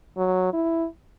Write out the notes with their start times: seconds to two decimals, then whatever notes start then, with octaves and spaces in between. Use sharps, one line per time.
0.17 F#3
0.53 E4